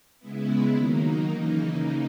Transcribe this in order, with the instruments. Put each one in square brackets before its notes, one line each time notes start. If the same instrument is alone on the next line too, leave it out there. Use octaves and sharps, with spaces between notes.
[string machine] C#3 G#3 B3 E4
D#3 F#3 A#3 D#4
C#3 E3 A#3